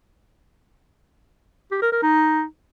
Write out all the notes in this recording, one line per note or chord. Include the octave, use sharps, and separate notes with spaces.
G4
A#4
A#4
D#4